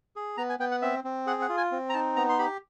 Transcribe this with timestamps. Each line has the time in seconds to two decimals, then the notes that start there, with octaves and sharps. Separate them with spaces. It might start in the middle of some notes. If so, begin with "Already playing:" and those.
0.16 G#4
0.37 B3 A#5
0.50 G#5
0.59 B3 G5
0.71 F#5
0.82 C4 E5
1.04 C4
1.27 G#4 F#5
1.42 F#5
1.49 F4
1.57 G#5
1.72 C4
1.90 A#5
1.93 D#4 A5
2.16 B3 A#5
2.29 C6
2.39 G4 B5